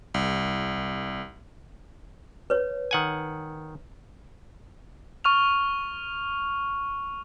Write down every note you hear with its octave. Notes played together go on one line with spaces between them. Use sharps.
C2
B4 C#5
D#3 F#5 G#5
C#6 F6 F7